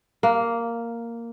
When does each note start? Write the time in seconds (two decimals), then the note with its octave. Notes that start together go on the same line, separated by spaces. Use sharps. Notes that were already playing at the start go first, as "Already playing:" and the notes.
0.23 A#3